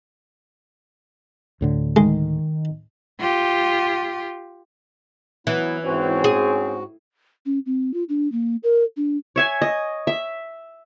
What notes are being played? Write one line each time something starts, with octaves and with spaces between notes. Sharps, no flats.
D2 A2 D3
D#3 G#3
F4 G4
E3 F#3 B3 E4
G#2 C4 C#4 F#4
G#4
C#4
C4
F4
D4
A#3
A#4
D4
C#5 E5 G#5
D#5
E5